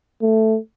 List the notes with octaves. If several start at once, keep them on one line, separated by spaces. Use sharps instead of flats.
A3